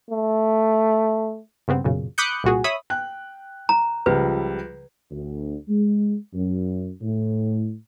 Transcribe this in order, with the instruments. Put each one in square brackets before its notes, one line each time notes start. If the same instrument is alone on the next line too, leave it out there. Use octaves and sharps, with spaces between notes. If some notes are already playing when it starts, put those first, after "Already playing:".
[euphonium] A3
[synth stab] G2 C#3 B3 C4
B1 F#2 A#2 C#3
B5 D6 D#6 F#6 G6 C#7
C2 A#2 F#4 G#4
C#5 E5 B5 D#6
[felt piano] G5 F#6
[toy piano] A#5
[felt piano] C#2 F3 G3 [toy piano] B4
[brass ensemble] D2
G#3
F#2
A2